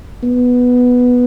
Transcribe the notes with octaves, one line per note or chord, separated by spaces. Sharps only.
B3